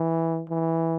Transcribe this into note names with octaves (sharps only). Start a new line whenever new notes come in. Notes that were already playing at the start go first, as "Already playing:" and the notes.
Already playing: E3
E3